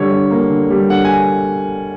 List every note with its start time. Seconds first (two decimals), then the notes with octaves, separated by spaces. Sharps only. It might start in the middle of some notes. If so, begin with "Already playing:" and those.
Already playing: D3 G3 C#5
0.11 D3
0.31 A#3
0.50 D3
0.70 G3
0.90 D3 F#5
1.05 G#5